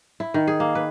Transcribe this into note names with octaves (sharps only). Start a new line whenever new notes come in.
E4
D#3
G#4
A#3
B4